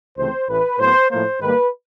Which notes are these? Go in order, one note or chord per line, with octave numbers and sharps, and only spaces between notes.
C#2 C3 E3 A3 C4 C5
A1 A2 E3 B4
A2 F#3 B3 C5
A2 F3 A#3 C5
G#2 D#3 G3 A#3 B4